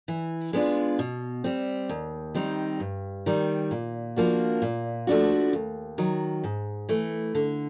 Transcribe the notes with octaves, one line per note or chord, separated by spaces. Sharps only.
E3
G#3 B3 D4 F4
B2
G3 C4
D#2
D#3 G3 C4 D#4
G2
D#3 G3
A#2
F3 A#3 D4 F#4
A#2
F3 A3 D4 F#4
D#2
D#3 F#3
G#2
E3 A3
D3